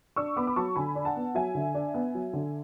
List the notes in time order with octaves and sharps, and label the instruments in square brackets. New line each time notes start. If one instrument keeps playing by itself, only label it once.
[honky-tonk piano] D4 C#6 E6
B3 B5 D6
D6
F#3 A5 C#6
D3 G#5 B5
D4
F#5 A5
B3
F#3 E5 G#5
D3
D4
B3
F#3
D3